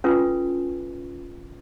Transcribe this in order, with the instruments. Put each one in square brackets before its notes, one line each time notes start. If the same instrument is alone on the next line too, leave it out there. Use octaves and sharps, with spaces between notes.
[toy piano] C#4 F4 A4 B4 G#5